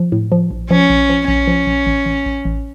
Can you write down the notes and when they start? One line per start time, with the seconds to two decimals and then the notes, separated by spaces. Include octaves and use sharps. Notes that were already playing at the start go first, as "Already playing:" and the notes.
Already playing: F3
0.12 A2
0.32 F3
0.51 A#1
0.71 F3 C#4
0.90 A#1
1.10 F3
1.28 A#1 C#4
1.47 F3
1.67 A#1
1.87 A1
2.06 A1
2.26 A1
2.45 A1